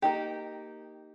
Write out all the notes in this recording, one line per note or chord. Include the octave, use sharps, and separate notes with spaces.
A#3 D#4 G4